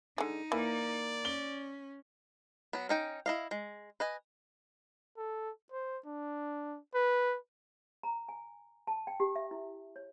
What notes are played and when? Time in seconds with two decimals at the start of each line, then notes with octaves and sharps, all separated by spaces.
0.18 D3 G#3 D#4
0.52 E3 A#3 D5
1.25 C#4 G7
2.73 F#3 B3
2.89 C#4 D#4 G5
3.26 E4 D#5 F5
3.51 G#3
4.00 B4 D#5 G#5
5.17 A4
5.72 C5
6.05 D4
6.94 B4
8.03 A#5
8.29 G#5
8.87 A5
9.07 G5
9.20 G4
9.36 E5
9.51 E4
9.96 C#5